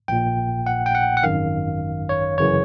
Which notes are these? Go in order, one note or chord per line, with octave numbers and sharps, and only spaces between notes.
A#1 A#2 G5
F#5
G5
F#5
F#5
G#1 F#2 D#3 F5
C#5
G1 F#2 C#3 E3 C#5